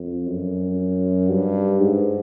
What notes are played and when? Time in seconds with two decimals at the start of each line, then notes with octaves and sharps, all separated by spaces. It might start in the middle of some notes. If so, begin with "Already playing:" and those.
Already playing: F2
0.28 F#2
1.29 G2
1.79 G#2